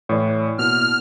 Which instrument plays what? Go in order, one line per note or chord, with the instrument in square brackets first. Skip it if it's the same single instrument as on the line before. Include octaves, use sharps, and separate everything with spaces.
[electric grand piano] A2 E3 [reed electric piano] C#5 D5
[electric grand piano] B2 [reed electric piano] A#3 E4 [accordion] F6